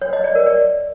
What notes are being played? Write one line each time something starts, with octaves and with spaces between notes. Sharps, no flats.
C#5
D#5
D5
A#4
D5